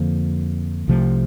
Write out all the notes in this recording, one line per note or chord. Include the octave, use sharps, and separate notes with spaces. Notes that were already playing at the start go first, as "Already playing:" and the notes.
Already playing: F2 D3 F3 A#3
C2 C3 F3 A3